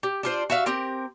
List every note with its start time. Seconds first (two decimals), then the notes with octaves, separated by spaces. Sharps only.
0.03 G4
0.23 D4 F4 C5
0.50 F#4 E5 F5
0.66 C4 G4 A#4